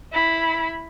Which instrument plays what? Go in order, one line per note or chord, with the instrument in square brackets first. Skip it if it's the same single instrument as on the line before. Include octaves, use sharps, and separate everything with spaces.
[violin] E4 B5